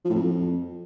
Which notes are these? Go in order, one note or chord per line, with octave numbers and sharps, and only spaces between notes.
F3
A2
F2